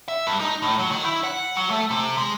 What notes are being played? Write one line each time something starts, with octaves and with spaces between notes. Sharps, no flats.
E5
G2
D#4
A2
F#3
D#3
E4
F#5
F#3
A3
C3
G#3